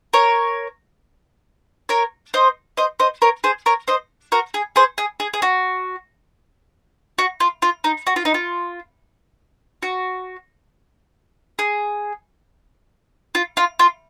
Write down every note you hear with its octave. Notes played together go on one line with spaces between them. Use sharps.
A#4 C#5
A#4 C#5
C5 D#5
C5 D#5
C5 D#5
A#4 C#5
G#4 C5
A#4 C#5
C5 D#5
F#4 A#4
G#4
G#4 C5
G#4
G#4
G#4
F#4
F#4
F4
F4
D#4
F#4
F4
D#4
F4
F#4
G#4
F4
F4
F4